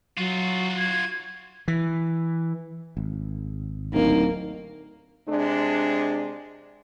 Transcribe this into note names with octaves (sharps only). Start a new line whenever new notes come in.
F#3 F4 F#4
G#6
E3
G#1
D1 A#3 D#4
C3 G#3 D4